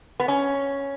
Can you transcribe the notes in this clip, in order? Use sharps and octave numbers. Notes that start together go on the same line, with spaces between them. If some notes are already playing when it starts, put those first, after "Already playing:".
B3
C#4